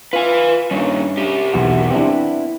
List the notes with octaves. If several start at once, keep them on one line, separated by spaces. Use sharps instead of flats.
F4 B4 G#5
G2 A#2 D#3 C#4
C2 G4
B1 E2 E3 F#4
B3 C4 D4 E4